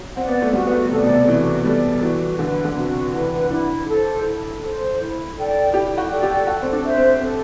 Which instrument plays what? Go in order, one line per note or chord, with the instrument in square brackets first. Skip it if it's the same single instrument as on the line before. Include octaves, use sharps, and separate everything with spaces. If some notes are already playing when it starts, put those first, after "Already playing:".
Already playing: [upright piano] F#3
[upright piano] C4 [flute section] D5 F#5
[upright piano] B3
A3
[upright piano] G3 [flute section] F#4
[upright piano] B3
A3
[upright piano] C3 [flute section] A4 D5
[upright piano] B2
C3
[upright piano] E3 [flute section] F#4
[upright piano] G3 [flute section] A4 D5
[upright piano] E3 [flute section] F#4
[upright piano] D3 [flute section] B4 F#5
[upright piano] D3
[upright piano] C3 [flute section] F#4
[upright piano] E3 [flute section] B4 F#5
[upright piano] D4 [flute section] E4
[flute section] A4 C5
E4
A4 C5
E4
A4 D5 G5
[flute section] E4 [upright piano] G4
[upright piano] F#4
[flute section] A4 D5 G5
[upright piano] G4
[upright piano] F#4 [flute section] A4
[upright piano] C4
D4
[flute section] C5 E5
[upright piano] C4
[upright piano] C4 [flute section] A4